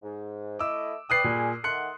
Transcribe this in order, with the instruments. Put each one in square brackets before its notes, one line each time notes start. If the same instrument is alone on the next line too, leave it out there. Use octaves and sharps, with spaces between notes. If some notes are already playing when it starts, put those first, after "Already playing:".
[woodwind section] G#2
[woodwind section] A3 E4 D#5 [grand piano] D6 E6
[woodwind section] B4 D5 G5 [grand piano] D#6 F#6 C7
[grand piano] A#2 [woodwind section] G3 G#4
[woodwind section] D#3 A3 F#5 [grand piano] C6 F#6 C#7